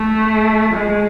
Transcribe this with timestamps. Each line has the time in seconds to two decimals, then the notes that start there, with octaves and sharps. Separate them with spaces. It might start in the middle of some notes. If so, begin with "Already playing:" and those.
Already playing: A3
0.74 G#3